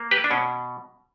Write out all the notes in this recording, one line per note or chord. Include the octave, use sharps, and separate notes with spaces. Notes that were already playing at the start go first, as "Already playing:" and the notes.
Already playing: A#3
G4 B4
D4
B2 C#4